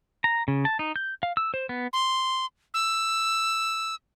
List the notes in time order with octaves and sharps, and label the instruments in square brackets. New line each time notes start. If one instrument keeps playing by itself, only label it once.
[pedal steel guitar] A#5
C#3
A5
D#4
G6
F5
E6
C5
B3
[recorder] C6
E6